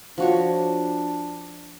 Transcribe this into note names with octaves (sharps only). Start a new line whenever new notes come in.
F3 D4 F#4 C#5